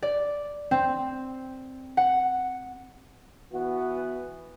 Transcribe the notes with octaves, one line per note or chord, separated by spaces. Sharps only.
D5
C4
F#5
E3 B3 F#4